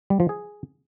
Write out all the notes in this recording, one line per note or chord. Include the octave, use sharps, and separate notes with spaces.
G3
F3
G#4